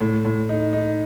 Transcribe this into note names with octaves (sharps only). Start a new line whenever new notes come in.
A2
A2
D#4
D#4